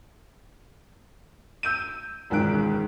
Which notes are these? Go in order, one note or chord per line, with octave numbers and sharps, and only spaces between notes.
E6 G6 D#7
E1 C#2 G#2 D#3 F#6 D7